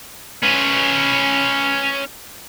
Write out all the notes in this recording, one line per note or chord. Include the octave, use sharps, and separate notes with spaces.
C#4 B4